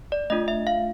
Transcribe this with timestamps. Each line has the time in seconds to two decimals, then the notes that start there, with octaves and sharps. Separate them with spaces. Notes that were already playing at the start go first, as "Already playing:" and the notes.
0.12 D5
0.30 A3 D4 F4 D#5
0.48 E5
0.67 F5